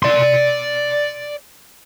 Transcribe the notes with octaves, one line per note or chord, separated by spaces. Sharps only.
D5 C6